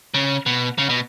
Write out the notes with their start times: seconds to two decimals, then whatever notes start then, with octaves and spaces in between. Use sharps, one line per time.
0.14 C#3
0.46 B2
0.78 C#3
0.89 B2